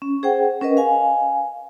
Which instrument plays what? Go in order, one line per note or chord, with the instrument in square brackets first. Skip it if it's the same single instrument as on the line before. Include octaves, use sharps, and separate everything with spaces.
[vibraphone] C#4
G#4 C5 F#5 G5
C#4 A#4 B4 D#5
F5 G#5